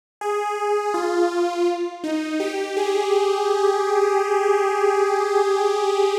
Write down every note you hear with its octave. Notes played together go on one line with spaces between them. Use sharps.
G#4
F4
D#4
G4
G#4